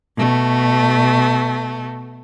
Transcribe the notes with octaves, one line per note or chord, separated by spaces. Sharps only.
B2 A3